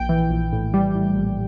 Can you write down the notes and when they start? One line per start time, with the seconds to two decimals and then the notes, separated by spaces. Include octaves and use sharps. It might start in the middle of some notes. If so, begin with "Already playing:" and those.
Already playing: A#1 G5
0.09 E3
0.30 A#1
0.53 A2
0.74 G3
0.95 A2
1.16 A#1